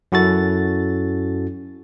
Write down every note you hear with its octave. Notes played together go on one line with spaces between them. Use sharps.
F#2 C#4 E4 F#4 A4 A6